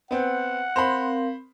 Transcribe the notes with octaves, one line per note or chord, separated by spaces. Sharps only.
B3 C4 F#5
C4 A#4 C5 F5 B5